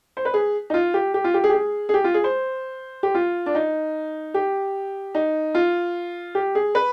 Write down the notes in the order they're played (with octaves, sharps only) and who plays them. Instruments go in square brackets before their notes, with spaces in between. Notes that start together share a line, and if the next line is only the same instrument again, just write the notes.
[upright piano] C5
B4
G#4
D#4
F4
G4
G4
F4
G4
G#4
G4
G#4
G#4
G4
F4
G#4
C5
G4
F4
D4
D#4
G4
D#4
F4
G4
G#4
B4